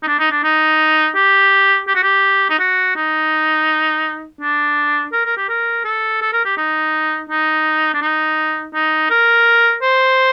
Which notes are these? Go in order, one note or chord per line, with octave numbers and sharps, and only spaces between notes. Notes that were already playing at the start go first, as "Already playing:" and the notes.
D#4
D4
D#4
D4
D#4
G4
G4
F#4
G4
D#4
F#4
D#4
D4
A#4
A#4
G4
A#4
A4
A4
A#4
G4
D#4
D#4
D4
D#4
D#4
A#4
C5